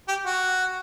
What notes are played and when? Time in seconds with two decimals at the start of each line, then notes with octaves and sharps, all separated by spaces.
0.08 G4
0.26 F#4